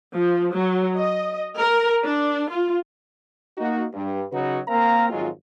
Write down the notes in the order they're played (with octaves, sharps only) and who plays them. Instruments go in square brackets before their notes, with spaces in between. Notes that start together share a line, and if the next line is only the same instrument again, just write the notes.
[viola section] F3
F#3
D#5
A#4
D4
F4
[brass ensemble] A#3 D#4 F#4
G2
C#3 F#3 D#4 F#4 B4
A#3 C4 A#4 F5 A#5
G#1 F2 F#3 G#3 F4